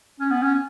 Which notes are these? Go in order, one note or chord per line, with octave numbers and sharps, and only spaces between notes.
C#4
B3
C#4